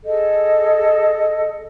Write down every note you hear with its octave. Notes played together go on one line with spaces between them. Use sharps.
G#4 A4 D#5